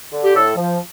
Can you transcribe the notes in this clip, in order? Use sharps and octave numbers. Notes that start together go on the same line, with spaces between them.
D3
G4
A2 A4
F3